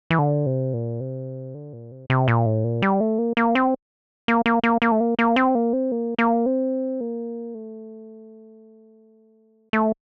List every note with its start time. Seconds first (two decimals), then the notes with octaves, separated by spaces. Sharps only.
0.10 E3
0.19 D3
0.46 C3
0.74 A#2
1.00 C3
1.55 D3
1.73 A#2
1.91 C3
2.10 C3
2.28 A#2
2.46 A2
2.64 A#2
2.82 G3
3.00 A3
3.18 A#3
3.37 A#3
3.55 C4
4.28 A#3
4.46 A#3
4.63 A#3
4.82 A#3
4.92 A3
5.00 A#3
5.19 A#3
5.36 C4
5.55 A#3
5.73 C4
5.92 A#3
6.18 A#3
6.46 C4
7.01 A#3
7.55 A3
9.73 A3